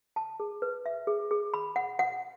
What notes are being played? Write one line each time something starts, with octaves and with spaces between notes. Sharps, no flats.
A5
G#4
B4
E5
G#4
G#4
B5
F#5
F#5